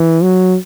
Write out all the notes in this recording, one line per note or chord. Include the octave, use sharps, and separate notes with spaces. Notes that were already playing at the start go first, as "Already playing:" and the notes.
Already playing: E3
F#3